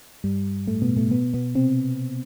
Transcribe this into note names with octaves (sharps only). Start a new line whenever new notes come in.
G2 G3
A2 A3
B2 B3
A2 A3
B2 B3
B2 B3
C3 C4